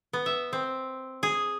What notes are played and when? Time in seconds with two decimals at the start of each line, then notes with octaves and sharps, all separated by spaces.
0.13 B3
0.26 E5
0.53 C4
1.23 G#4